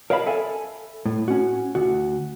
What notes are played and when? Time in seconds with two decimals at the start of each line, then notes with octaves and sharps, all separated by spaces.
0.10 A#4 C#5 D#5 F5 A5 B5
0.26 A4 E5 G#5
1.06 A2
1.28 C#4 F#4
1.75 D2 F#4